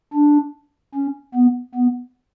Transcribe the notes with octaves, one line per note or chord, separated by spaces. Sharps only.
D4
C#4
B3
B3